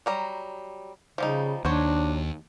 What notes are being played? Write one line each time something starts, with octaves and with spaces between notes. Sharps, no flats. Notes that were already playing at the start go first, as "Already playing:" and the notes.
F#3 G3 A#5
C#3 F3 G3 D#4
D#2 F#3 D4 C5 C#5